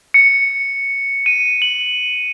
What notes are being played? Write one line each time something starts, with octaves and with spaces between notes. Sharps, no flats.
C#7
D#7
F#7